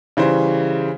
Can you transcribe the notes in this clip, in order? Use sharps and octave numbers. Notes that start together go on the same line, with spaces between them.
C#3 E3 G3 C5